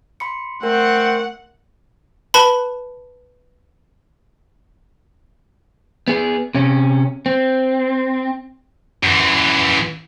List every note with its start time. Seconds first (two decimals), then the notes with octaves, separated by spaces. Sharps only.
0.20 B5 C6 C#7
0.63 A3 C4 A#4 F#5
2.34 B4 A5 B5
6.08 B3 G#4
6.55 C3 C#4
7.26 C4
9.03 F#2 E3